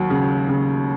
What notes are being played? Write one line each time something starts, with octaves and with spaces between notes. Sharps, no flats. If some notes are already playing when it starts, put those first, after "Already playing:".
Already playing: D#2 F#3
C#3
C#3